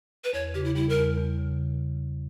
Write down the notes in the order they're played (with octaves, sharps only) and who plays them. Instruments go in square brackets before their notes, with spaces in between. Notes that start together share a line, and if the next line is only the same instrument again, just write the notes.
[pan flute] B4
[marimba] E2 [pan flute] C#5
[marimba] C#3 [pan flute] G4
[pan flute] E4
[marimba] G3 [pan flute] E4
[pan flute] A#4
[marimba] E2
E2
C#3